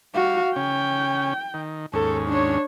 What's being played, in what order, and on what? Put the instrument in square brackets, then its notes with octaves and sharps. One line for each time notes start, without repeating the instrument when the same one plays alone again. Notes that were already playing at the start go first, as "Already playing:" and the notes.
[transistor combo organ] G3 [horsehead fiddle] F#4 F5
[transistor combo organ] C#3 C#4 [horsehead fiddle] G5
[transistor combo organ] D#3
[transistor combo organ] D#2 G#2 C#4 [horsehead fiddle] A4
[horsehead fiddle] D4 C#5